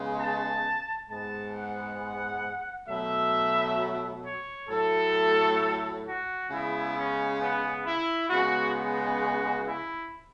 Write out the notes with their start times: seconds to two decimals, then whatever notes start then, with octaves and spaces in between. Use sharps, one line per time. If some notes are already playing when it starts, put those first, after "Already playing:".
Already playing: C#3 G#3 B3
0.17 A5
1.07 G#2 G#3 B3 A5
1.53 F#5
2.88 B2 F#3 A3 E5
4.24 C#5
4.69 A2 F#3 A3 A4
6.04 F#4
6.49 C#3 G#3 B3 E4
6.94 C#4
7.40 B3
7.85 E4
8.30 C#3 G#3 B3 F#4
8.75 F#4
9.65 E4